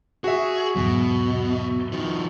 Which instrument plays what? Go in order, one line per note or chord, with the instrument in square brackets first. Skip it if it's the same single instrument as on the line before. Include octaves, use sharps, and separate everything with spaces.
[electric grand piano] F#4 E5 [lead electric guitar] G#4
[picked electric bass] E2 G#2 F#3 [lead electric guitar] B2
[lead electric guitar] D#3 F3